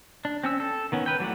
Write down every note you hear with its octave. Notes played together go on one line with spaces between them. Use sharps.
D4
C4 C#4 E6
A4
D#3 B3 C#4
B4 G5
E3 F#3 A3 D5 F#5